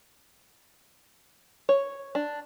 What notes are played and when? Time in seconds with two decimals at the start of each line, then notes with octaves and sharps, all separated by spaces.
1.69 C#5
2.15 D4